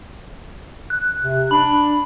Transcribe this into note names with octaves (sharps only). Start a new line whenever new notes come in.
F#6
C3
D4 B5